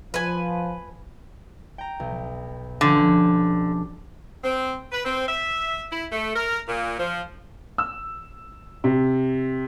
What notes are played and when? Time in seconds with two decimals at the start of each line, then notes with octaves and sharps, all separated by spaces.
0.14 F3 B4 G#5
1.78 G5 A#5
2.00 B1
2.81 D3 F3 C#4 G4
4.44 C4
4.91 B4
5.05 C4
5.27 E5
5.91 E4
6.11 A3
6.36 A#4
6.67 A#2
6.98 F3
7.78 E6
8.84 C3